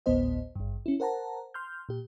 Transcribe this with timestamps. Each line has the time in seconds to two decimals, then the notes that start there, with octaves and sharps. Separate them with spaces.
0.06 G#1 D2 A2 B3 C5 D#5
0.56 G#1 G2
0.86 C#4 E4
1.00 A#4 C5 F#5 A5 A#5
1.54 C6 F6 G6
1.89 A#2 G4